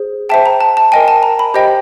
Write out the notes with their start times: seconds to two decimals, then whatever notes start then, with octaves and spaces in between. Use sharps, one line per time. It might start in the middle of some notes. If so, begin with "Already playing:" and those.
Already playing: G#4 C5
0.29 C5 E5 G5 A5
0.46 A#5
0.61 A5
0.77 A5
0.92 A#4 D#5 G5 G#5
1.08 A5
1.23 A#5
1.39 B5
1.54 G4 C5 D#5 G5